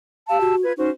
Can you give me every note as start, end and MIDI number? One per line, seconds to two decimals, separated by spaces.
0.29 0.55 67
0.29 0.40 77
0.29 0.55 81
0.29 0.55 88
0.41 0.64 66
0.63 0.73 65
0.63 0.73 71
0.63 0.73 92
0.77 0.89 61
0.77 0.90 63
0.77 0.89 66
0.77 0.89 72